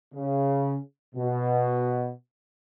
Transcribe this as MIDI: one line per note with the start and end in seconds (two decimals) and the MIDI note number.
0.14 0.76 49
1.15 2.11 47